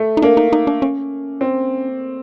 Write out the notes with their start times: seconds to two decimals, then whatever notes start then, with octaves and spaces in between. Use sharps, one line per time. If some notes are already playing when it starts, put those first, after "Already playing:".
Already playing: A3
0.17 D#4
0.22 A#3 D4
0.37 D#4
0.52 D#4
0.67 D4
0.82 C#4
1.41 C4